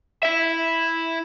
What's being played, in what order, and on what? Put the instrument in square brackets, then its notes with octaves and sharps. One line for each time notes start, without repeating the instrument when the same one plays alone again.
[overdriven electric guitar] E4 E5